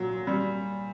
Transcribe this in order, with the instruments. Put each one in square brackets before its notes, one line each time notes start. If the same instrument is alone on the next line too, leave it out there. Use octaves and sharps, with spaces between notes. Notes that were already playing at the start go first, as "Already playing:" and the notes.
Already playing: [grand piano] A#2 [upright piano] F#3
[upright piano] G3